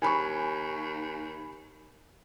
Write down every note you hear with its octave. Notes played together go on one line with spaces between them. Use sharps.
D#2 G#5 B5 C#6